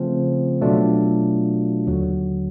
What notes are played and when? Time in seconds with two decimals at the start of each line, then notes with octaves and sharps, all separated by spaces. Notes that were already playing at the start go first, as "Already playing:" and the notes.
Already playing: C#3 F3 A3 C4
0.62 B2 F#3 A3 D4 F4
1.87 D#2 D3 F#3